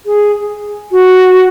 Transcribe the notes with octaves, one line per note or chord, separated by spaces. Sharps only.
G#4
F#4